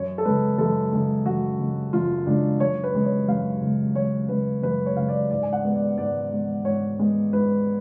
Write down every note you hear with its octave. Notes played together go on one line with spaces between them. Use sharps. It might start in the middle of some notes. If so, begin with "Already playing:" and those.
Already playing: F#2 C#5
A4
C#3 G#3 B4
F#2 A4
C#3 G#3
F#2 F#4
C#3 G#3
F#2 F4
C#3 G#3 D4
F#2 C#5
B4
C#3 G#3
C#5
F#2 F5
C#3 G#3
F#2 C#5
C#3 G#3 B4
F#2 B4
C#5
C#3 G#3 F5
D5
G#2 D5
G#5
F#5
G#3 B3
D5
G#2 D5
G#3 B3
G#2 C#5
G#3 B3
G#2 B4